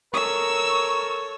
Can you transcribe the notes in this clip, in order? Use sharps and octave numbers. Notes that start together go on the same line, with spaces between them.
A4 A#4 C#5 C#6 E6